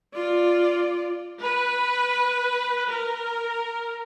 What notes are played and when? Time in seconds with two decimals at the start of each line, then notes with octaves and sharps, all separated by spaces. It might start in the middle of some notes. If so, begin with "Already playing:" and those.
0.15 F4 D5
1.40 B4
2.88 A#4